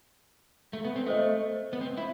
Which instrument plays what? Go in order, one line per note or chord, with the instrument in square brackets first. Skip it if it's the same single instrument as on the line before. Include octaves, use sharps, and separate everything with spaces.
[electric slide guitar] A3
B3
C4
[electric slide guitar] A3 [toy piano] A4 C5 D#5
[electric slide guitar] B3
C4
E4